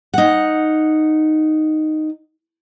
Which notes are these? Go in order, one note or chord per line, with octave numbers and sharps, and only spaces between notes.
D#4 F#5